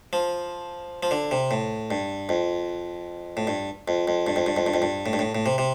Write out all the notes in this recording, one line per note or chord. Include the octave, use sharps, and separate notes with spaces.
F3
F3
D3
C3
A2
G2
F2
A2
G2
F2
F2
G2
F2
G2
F2
G2
F2
G2
A2
G2
A2
A2
C3
C3